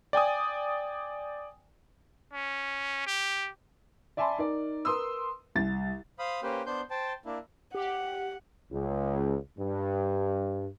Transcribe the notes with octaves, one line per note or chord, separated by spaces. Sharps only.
D5 G5 G#5 D#6
C#4
G4
D5 E5 G#5 A5 B5 C6
D#4 A#4 D5
A#4 B4 C6 D#6 E6
C2 A6
C5 F5 B5 D#6
A#3 C#4 G4 B4 C5
B3 D4 C5 C6 G6
C5 G5 A5
A#3 D4 E4
G4 F#5
C#2
G2